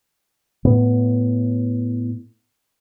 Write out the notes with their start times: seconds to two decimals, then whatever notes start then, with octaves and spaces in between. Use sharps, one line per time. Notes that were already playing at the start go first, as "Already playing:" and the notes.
0.65 A2 B3